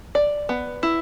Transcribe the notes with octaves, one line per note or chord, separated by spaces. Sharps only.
D5
B3
E4